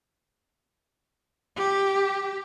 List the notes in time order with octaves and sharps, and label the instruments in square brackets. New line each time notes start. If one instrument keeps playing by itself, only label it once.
[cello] G4